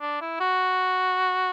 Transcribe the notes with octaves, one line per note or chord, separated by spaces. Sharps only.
D4
E4
F#4